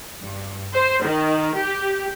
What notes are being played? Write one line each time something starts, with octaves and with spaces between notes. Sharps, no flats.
G2
C5
D#3
G4